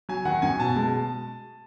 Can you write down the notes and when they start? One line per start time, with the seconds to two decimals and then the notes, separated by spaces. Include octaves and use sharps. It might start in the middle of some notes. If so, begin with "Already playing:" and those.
0.09 F#3 G#5
0.25 D#3 F#5
0.42 F#2 G#5
0.59 B2 A5
0.76 G#3